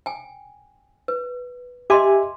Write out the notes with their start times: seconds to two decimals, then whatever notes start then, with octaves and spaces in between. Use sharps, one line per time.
0.06 G5 G#5
1.08 B4
1.90 G4 D#5 E5 G#5 C6 D6